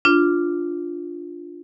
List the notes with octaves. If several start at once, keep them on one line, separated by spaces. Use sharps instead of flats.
D4 F4